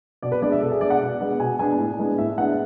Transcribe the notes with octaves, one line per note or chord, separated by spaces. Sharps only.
B2 D5
B4
G#3 B3 D4 D5
E5
B2 A4
G#4
G#3 B3 D4 D5
F#5
B2
G#3 B3 D4
B2 G#5
G#3 B3 D4 G#5
A2
G#3 B3 D4
A2 E5
G#3 B3 D4 F#5